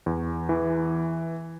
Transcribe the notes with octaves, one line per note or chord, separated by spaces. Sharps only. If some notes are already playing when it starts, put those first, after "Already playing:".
E2
E3